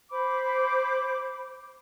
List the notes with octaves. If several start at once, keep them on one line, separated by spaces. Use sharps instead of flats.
C5 B5 D6